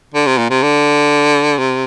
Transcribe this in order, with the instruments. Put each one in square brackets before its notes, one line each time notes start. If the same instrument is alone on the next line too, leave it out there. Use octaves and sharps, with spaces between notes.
[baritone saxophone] D3
C3
A#2
C3
D3
C3